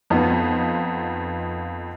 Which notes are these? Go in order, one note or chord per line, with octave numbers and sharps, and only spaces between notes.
F2 B3 D#4 F4